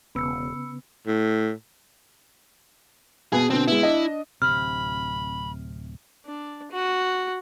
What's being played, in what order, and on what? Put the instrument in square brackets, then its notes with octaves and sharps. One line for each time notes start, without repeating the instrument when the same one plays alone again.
[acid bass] E1 [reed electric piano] C#3 B3 [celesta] B5 E6 C#7
[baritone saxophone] A2
[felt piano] B2 B3 G#5 [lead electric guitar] G#4
[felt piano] B2 D3 [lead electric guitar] C4
[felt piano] G#3 B3 [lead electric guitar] E4
[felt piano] D4 D#5
[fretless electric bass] D1 G1 C3 [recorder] B5 [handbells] F6
[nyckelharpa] D4
F#4